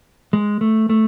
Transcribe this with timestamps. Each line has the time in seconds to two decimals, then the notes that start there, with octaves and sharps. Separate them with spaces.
0.33 G#3
0.61 A3
0.90 A3